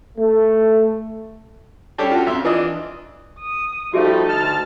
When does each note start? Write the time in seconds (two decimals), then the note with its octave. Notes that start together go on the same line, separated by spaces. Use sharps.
0.17 A3
1.98 G3 C#4 D4 G4 A4
2.11 F4 F#4 A4
2.27 F2 E5 C6
2.45 E3 D4 F4 D#5
3.39 D#6
3.93 F3 G3 A3 D#4 F#4 G#4 A4 E5
4.29 D2 A5 F6